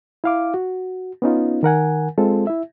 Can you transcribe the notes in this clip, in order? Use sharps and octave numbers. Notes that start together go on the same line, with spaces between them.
E4 F5 D6
F#4
B3 C#4 D#4 F4
D#3 A#4 F#5 G#5
G#3 C4 F4 A4
E4 E5